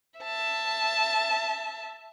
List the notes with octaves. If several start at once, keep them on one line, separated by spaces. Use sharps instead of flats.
E5 A5